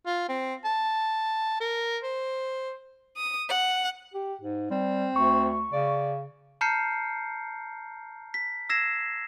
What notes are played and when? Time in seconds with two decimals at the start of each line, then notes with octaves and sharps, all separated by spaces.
0.06 F4
0.29 C4
0.65 A5
1.61 A#4
2.03 C5
3.17 D#6
3.49 F#5
4.14 G4
4.41 G#2
4.71 G3 C4
5.16 D2 C#6
5.73 C#3 D5
6.61 A5 A#5 F6 G6 C7 C#7
8.34 B6
8.69 E6 G#6 A#6 C7 E7